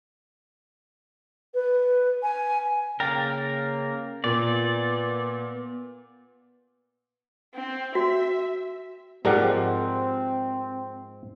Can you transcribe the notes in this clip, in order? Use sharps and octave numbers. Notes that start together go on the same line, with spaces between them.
B4
G#5
C#3 A#3 A#4 G5 A6
A#2 B3 D5
C4
F#4 E5
G#2 F3 G#3 C4 G4 A#4 D5 F#5